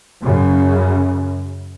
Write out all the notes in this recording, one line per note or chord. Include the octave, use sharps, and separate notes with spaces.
F#2 C#3